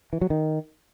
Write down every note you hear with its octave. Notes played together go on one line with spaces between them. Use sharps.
E3
F#3
D#3